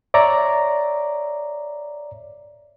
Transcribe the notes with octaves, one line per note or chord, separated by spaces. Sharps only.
C#5 D5 E5 A#5